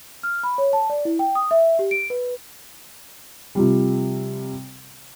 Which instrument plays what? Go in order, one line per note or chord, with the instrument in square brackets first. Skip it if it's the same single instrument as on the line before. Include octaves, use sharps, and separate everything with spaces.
[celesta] F6
B5
C#5
A5
D5
E4
G5
D#6
E5
G4
D7
B4
[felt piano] C3 F3 G3